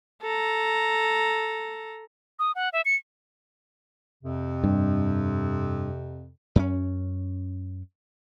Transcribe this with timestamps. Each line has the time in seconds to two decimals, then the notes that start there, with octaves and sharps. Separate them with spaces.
0.22 A4 A#5
2.39 D#6
2.55 F#5
2.73 E5
2.85 C#7
4.23 F2 C3
4.64 G2
6.56 F#2 C4 C#4